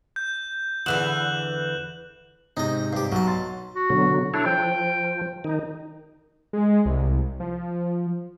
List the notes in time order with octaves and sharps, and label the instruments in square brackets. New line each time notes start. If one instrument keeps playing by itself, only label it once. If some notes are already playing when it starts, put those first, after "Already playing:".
[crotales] G6
[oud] E2 D3 E3 [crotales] F#6 E7 F#7
[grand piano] G#2 C3 [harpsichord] D#4 D#5
[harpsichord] G2 G4
[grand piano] B1 [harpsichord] F#3 A5
[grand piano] C6 A6
[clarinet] F#4
[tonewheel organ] B2 D3 F#3
[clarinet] D4 [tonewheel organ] E4 A4 C#5
[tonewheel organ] F3 [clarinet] G5
[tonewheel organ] D#3 D#4
[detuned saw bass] G#3
C2
F3